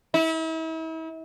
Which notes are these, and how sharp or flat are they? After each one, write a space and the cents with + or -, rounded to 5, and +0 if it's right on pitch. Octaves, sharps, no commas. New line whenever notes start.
E4 -40